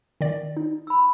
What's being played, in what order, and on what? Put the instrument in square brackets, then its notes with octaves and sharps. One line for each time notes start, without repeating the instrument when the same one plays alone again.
[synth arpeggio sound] D#3 D5
D#4
[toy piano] B5 E6